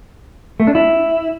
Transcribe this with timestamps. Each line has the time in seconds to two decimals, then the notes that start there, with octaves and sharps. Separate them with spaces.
0.60 A3
0.67 D4
0.75 E4